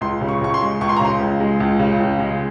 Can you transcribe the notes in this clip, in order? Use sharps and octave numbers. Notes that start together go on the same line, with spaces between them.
C#2 C6
C#3
C#6
C#2 C#6
C6
G#3
C#2 C#6
C6
A#5
C#3 C6
C#2
G#3
C#2
C#3
C#2
G#3